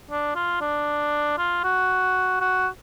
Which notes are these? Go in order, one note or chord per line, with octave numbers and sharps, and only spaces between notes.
D4
F4
D4
F4
F#4
F#4